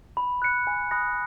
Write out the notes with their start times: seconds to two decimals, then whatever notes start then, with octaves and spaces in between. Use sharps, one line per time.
0.17 B5
0.42 F#6 C#7
0.67 G#5
0.91 B5 D#6 F#6 A#6